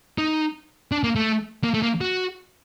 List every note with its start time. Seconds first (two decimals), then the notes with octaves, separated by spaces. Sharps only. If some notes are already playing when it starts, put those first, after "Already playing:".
0.18 D#4
0.92 D4
1.04 A#3
1.16 A3
1.64 A#3
1.74 A3
1.83 A#3
2.01 F#4